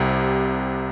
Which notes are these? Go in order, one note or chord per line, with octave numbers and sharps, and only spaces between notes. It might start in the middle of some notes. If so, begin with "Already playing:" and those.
Already playing: C2 C3